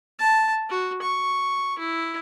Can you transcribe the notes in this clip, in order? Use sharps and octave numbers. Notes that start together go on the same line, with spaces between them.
A5
F#4
C#6
E4